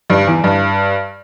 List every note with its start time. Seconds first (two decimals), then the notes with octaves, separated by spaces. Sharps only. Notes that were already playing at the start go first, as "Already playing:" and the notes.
0.10 G2
0.27 E2
0.44 G2